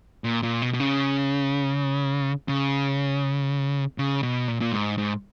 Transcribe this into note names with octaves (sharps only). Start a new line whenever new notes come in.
A#2
A#2
B2
B2
C#3
C#3
C#3
B2
A#2
A#2
G#2
G#2